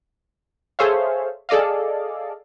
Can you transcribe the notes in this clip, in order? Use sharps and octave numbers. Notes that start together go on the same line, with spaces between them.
G#4 A4 C5 C#5 E5 F5
G#4 A4 D5 D#5 F5